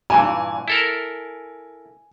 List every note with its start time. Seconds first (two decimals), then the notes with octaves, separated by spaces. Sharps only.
0.10 G2 A#2 E3 G#5
0.68 E4 A4 A#4